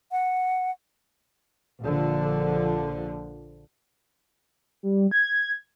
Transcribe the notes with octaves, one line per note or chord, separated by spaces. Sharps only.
F#5
A#1 D3 F3
G3
G#6